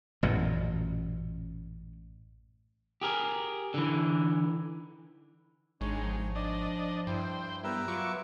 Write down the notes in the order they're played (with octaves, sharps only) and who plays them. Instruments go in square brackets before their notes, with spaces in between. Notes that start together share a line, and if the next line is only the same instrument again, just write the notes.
[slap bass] A1 F#2 A#2
[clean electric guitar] G4 G#4 A#4
D3 E3
[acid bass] G#1 [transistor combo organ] D#3 G#3 [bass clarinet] D4 [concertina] C#5
[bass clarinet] F3
[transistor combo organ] D4 D#5 [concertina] D5
[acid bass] G2 [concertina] E4 [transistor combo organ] C5 G5
[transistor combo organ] G3 [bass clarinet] B3 [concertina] A#4 B4 E5
[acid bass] F#3 [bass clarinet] F4 [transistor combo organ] C#6 D6